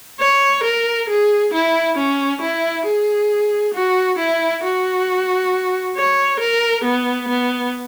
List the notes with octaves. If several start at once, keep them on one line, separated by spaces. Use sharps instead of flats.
C#5
A#4
G#4
E4
C#4
E4
G#4
F#4
E4
F#4
C#5
A#4
B3
B3